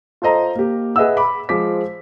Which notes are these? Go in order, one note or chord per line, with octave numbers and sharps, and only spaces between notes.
F4 A4 C5 D#5 A#5
A#3 G4
G#4 B4 D#5 E5 F#5 E6
B5 D6
F3 G#3 C5 D6 B6